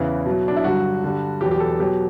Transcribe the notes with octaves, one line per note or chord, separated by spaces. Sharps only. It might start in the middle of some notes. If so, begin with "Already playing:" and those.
Already playing: E2 C#3 E3 E4
B2 F#3
D4
E4
G2 D3 F#3 F#4
G2 D3 G3
E2 B2 F#3 G4
G4
A4
B2 F#3 G4